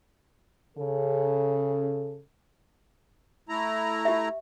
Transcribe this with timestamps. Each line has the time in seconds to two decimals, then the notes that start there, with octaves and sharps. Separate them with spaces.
0.77 C#3 A4
3.49 A3 E4 A#5
4.05 G4 E5